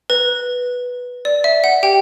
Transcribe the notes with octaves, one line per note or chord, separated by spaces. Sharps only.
B4
D5
E5
F#5
G4 G5